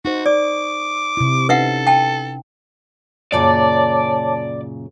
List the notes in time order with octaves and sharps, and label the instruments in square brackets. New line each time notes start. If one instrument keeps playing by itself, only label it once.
[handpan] D#4 C5 [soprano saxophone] F#4
[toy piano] D5 [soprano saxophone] D6
[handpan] C3 E4
[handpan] C#4 D#4 [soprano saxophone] A4 [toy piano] B4 E5 F#5
[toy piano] G5 A5
[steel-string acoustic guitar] F#2 A#2 C#3 [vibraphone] C#5 A5 D6 [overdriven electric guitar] D5